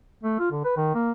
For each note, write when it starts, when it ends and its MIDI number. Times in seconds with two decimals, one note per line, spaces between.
0.23 0.35 57
0.39 0.51 65
0.51 0.63 50
0.64 0.77 71
0.77 0.94 51
0.95 1.11 58